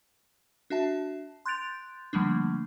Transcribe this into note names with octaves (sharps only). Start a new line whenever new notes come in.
D4 F#4 E5 A5
C6 F#6 G6 A6 D7 F7
D3 F3 G3 A3 A#3 D4